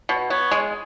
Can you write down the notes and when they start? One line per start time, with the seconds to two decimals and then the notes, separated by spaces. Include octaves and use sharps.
0.09 B2
0.30 B3 C#5
0.51 G#3